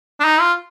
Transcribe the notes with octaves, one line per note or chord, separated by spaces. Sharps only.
D4
D#4
F4